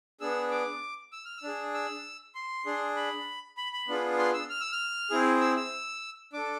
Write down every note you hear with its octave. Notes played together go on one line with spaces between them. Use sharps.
B3 D4 G#4 E6
D6
E6
F6
E6
D4 G#4
E6
C6
D4 G#4
B5
B5
B5
B3 D4 F4 G#4
C6
E6
F6
E6
F6
C4 E4 G#4
E6
E6
D4 A4 D6